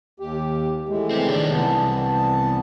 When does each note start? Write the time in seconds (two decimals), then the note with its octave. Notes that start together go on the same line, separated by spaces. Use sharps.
0.20 D#2 G4
0.89 A2 E3 G#3
1.11 C4 G4
1.28 D#3 D4
1.50 C2 E3 B3 A5